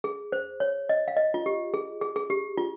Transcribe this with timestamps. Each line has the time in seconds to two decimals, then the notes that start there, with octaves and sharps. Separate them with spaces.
0.04 G#4
0.32 C5
0.60 C#5
0.89 D#5
1.08 F5
1.17 D#5
1.34 F4
1.46 G4
1.74 G#4
2.01 G#4
2.16 G#4
2.30 G4
2.57 F4